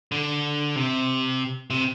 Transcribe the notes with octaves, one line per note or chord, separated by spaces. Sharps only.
D3
C3
C3